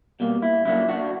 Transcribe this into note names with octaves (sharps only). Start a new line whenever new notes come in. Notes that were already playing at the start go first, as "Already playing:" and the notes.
B2 G3 A#3
E4
C#3 F#3 A#3 D4 E4
D4 F#4